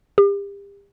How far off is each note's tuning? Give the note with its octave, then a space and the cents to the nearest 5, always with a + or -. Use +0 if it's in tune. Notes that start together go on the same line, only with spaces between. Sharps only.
G4 +35